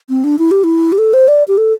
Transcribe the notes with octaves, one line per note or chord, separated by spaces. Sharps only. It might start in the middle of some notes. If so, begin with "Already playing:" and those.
C4
D4
E4
G4
E4
G4
A4
C5
D5
G4
A4